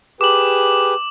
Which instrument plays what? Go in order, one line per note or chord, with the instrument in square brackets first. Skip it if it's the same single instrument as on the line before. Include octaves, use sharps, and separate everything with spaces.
[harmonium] G4 G#4 B4 [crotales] D6 F#7